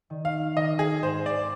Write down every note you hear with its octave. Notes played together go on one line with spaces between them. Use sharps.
D#3
F5
D#3 D#5
G#4
G#2 C5
D5